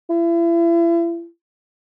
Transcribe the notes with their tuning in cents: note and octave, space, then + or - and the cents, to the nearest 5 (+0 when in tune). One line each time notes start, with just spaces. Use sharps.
E4 +40